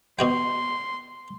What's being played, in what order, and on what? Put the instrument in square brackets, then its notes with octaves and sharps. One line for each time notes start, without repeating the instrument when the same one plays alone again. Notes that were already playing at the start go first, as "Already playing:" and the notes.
[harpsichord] B2 F#4 G5 [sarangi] C6